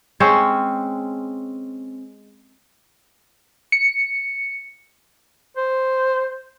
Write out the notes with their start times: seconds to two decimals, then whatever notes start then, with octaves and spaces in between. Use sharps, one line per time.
0.20 G#3 C4 C#4 C5
3.72 C#7
5.57 C5